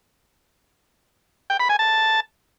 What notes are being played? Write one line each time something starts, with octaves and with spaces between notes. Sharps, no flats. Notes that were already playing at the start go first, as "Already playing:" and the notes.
G5
B5
G#5
A5